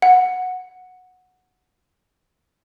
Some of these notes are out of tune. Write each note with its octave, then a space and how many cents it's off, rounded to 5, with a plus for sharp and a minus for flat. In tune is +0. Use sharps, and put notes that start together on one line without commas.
F#5 -10